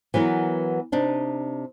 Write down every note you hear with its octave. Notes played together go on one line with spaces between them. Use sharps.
E3 F#3 B3 A#4
C3 D4 D#4